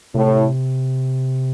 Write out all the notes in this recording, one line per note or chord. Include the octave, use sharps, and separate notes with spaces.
A2 C3